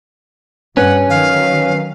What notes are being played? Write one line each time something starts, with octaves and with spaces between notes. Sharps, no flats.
G2 C#4 B4 F#5
D#3 F#3 F5